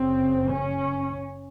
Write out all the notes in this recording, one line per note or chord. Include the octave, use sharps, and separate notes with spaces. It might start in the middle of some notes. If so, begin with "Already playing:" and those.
Already playing: F#1 F#2 C#3 C4
C#4